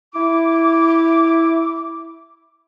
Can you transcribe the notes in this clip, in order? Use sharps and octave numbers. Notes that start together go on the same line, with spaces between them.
E4 D6